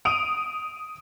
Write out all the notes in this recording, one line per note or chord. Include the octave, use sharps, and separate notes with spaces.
D#6 D7 D#7 F7